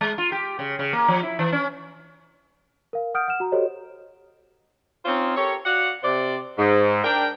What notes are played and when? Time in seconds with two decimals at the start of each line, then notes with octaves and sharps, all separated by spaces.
0.01 G#3
0.18 F4
0.32 G4
0.59 C#3
0.79 C#3
0.93 A#3
1.08 F3
1.23 E4
1.39 E3
1.52 C#4
2.93 A#4 F5
3.14 F#5 D#6 F6 G6 D7
3.28 F#5 F6 E7
3.40 F#4 A#5
3.52 F#4 G4 A4 C5 C#5 D#5
5.05 C4 C#4 D#4 F4 C5 C#5
5.36 G4 A4 A#4 C#5
5.66 F#4 D5 F5 F#5
6.03 C3 C5 D5
6.58 G#2
7.04 D4 A#4 G5